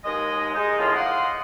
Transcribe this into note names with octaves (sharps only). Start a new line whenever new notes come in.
D#2 G#3 D#5
G#3 D#4
F#2 A2 F3 G#3 A#3 F4
D#5 F5 F#5 C6 D6 D#6